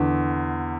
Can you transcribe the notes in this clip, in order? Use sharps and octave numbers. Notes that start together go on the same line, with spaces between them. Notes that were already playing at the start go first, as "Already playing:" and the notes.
Already playing: E2 D3